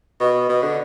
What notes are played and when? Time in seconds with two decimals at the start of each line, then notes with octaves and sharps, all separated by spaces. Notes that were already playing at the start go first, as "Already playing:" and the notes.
0.20 B2
0.49 B2
0.63 D3